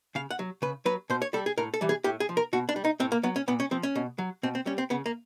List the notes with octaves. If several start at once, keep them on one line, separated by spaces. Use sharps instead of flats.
C#3 F5
F#5
F#3
C#3 B4
F#3 B4
B2 C5
C#5
G3 A4
G#4
A2 A#4
A4
E3 G3
G#4
A2 G4
G#4
F3
A#4
B2 F#4
D4
G3
D#4
A2 C4
A#3
F#3 B3
C#4
A#2 B3
C#4
F3 C4
C#4
B2
F#3
B2 C4
C4
G3 C#4
C4
C#3 B3
A#3